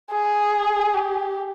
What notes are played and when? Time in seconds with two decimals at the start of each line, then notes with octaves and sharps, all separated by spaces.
0.12 G#4
0.94 G4